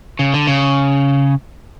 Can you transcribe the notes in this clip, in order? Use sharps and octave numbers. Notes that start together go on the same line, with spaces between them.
C#3
D3
C#3